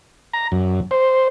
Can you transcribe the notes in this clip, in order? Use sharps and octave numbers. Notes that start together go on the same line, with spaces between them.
A#5
F#2
C5